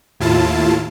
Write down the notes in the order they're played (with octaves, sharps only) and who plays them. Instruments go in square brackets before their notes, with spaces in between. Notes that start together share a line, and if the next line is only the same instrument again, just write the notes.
[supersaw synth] D#2 A2 E4 F4 A5